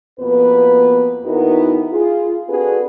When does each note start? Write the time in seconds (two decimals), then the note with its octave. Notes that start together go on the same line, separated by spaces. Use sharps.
0.19 F2 B2 A#3 B3 B4
1.25 D#2 B3 D#4 E4 F#4 A#4
1.91 F4 G#4
2.49 C4 D4 F#4 G#4 A4 B4